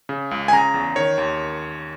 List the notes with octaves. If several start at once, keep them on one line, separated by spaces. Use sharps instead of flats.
C#3
C#2
G#5
C#3 A#5
E2
D#3 C#5
D#2